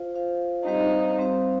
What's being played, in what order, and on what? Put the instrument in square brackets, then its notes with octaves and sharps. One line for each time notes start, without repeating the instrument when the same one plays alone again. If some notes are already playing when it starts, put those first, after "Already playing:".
Already playing: [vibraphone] F4 C5 F5
F4 C5 F5
[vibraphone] G3 C4 G4 C5 F5 [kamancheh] D#4
[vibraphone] G3 C4 G4 C5 F5